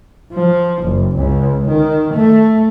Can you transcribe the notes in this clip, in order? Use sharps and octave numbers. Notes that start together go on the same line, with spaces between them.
F3
F#1
C#2
D#3
A3